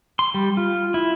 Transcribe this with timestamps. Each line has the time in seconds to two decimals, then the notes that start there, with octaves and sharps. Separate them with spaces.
0.19 C6
0.34 G3
0.57 F4
0.94 E4